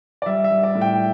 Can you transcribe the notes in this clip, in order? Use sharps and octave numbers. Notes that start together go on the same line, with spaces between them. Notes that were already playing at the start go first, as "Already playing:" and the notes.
D5
G3 E5
E5
G3
D5
A2
G5